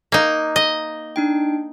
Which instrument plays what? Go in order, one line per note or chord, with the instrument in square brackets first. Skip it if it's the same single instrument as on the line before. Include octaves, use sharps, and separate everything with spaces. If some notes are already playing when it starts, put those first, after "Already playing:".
[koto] A#3 D#4
D#5
[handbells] D4 D#4 G5